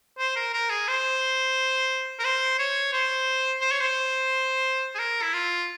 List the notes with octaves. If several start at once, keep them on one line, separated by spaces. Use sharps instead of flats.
C5
A#4
A#4
G#4
C5
A#4
C5
C#5
C5
C5
C#5
C5
G#4
A#4
E4
F4